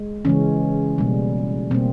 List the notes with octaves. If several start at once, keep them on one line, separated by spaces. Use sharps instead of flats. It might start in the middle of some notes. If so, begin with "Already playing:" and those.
Already playing: G#3
C#3 E3 G#3 C#4
B2 G3 A#3
B2 G3 A#3 C4